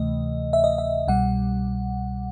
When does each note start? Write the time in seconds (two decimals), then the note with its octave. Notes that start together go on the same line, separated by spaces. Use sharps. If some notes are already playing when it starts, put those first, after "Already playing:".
Already playing: D2 C3 E3 A3 D#5
0.53 E5
0.64 D#5
0.78 E5
1.08 C2 B2 G3 F#5